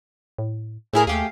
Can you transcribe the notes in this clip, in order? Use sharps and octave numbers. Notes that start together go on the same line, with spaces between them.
A2
A2 A3 E4 G#4 A#4
D#2 A3 G4 G#4 F5